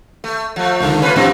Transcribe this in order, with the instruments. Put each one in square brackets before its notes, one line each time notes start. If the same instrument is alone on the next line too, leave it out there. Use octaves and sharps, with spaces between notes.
[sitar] A3
F3 A3
[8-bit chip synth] C#2 D3 D#3
[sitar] A3 F4 B4 [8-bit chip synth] C#4
[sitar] F#2 F3 C4 [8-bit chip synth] A2 G3